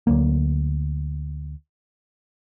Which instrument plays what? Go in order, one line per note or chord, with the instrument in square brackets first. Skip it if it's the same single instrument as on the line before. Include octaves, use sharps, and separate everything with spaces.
[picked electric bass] D2 F#3 A#3